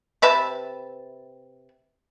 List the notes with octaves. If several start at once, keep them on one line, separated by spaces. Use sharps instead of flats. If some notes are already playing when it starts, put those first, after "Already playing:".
C3 B4 E5 A5